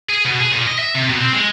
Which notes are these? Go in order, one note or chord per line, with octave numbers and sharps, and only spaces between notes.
G#4
B2
G#4
A#2
D#5
E5
C3
B2
C4
G#3